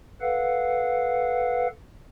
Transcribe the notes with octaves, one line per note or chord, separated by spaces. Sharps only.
A4 B4 F5 F#5